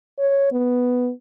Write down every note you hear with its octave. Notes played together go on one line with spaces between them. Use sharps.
C#5
B3